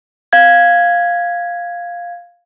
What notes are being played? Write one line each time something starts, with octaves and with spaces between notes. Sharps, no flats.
F5 G#6